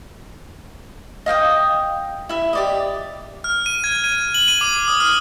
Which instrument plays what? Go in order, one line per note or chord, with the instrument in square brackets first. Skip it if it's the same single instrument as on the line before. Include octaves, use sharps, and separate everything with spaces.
[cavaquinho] D#5 F5 G5 D#6
E4 E5
G4 D5 D#5
[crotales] F6
D#7
G#6
D#7
F#7
D#7
D6
D#6
F6